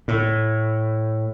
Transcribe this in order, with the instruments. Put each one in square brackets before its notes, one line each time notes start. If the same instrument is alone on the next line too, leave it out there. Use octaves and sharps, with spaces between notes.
[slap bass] A2